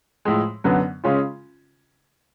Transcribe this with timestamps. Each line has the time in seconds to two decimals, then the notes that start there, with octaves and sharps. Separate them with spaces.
0.25 A2 F3 G#3
0.64 F#2 D3 F#3 B3
1.04 C#3 G#3 C#4 F4